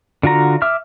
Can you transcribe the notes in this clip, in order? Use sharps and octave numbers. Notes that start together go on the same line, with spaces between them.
D3 F4 F#4 A#5
E5 D6 E6 F6